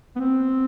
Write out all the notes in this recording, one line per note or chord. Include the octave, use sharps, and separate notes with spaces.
B3
C4